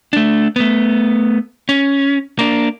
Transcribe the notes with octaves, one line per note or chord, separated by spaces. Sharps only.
A3 D4
A3 B3
C#4
A#3 D4